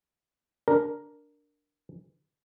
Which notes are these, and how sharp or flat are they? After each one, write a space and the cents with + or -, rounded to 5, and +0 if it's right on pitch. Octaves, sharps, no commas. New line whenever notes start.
D4 +0 A#4 +0